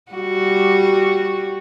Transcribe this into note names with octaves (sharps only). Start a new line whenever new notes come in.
G3 F#4